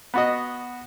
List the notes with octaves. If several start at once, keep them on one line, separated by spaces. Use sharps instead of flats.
B3 F#4 D#5